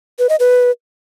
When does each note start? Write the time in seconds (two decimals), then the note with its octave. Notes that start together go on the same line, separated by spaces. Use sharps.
0.19 B4
0.29 D#5
0.40 B4